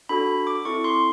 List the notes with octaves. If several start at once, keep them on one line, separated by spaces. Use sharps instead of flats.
D4 F#4 A4 B5
D6
C4 E4 A4 C#6
C6